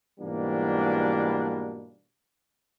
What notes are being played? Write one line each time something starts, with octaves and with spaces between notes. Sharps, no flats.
G#2 B2 E3 G3 A#3 D4